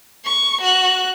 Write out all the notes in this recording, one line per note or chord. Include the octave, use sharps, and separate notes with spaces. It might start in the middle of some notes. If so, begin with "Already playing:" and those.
C#6
F#4 F#6